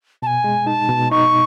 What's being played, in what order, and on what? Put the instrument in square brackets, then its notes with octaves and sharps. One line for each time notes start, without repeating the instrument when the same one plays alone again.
[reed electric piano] B2 [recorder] G#5 A5
[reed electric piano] G#3
[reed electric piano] D#4 [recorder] A5
[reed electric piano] B2
[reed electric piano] D#4 [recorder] C#6